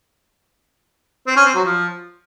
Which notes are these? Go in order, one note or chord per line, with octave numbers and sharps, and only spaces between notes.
C4
C#4
C4
F#3
F3